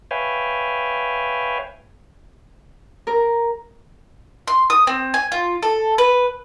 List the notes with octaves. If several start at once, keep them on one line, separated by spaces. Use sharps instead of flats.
B4 C#5 E5 F5 G5 G#5
A#4
C6
D#6
C4
G#5
F4
A4
B4